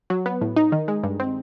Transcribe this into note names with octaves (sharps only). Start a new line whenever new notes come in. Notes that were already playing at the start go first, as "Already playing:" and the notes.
F#3
B3
A2
D#4
D#3
G#3
G2
C4